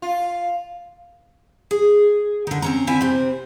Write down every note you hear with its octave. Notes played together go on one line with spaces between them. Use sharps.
F4
G#4
D3 D#3
C4 C#4 A#5
D3 C4 E4 E5 G#5
C3 C4